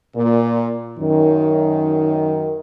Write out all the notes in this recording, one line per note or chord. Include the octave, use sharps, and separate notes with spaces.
A#2
F#2 D#3